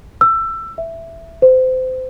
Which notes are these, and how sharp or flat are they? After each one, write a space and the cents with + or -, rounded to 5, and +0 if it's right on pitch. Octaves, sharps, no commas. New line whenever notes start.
E6 +20
E5 +5
C5 -25